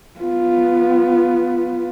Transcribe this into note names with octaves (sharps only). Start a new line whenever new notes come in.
B3 F4